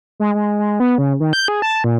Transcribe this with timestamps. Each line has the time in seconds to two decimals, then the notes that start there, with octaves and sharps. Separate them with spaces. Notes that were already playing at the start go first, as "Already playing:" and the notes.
0.20 G#3
0.35 G#3
0.59 G#3
0.80 B3
0.98 C#3
1.20 D#3
1.33 G6
1.48 G#4
1.62 A5
1.84 A#2